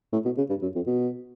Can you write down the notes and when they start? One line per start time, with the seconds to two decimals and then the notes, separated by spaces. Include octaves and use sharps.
0.13 A2
0.25 B2
0.38 C#3
0.49 G2
0.62 F#2
0.75 F2
0.86 B2